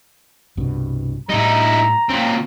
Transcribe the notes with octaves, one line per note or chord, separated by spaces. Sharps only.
C2 G2 B2
A2 G3 D#4 E4 A#5
A#2 C4 C#4